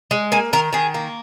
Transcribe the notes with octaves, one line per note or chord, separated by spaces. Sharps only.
G#3
A#3 G#5
D#3 A#4
D#3 G#4
A#3